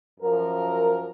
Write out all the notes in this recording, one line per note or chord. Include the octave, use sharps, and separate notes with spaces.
F#2 F3 A#4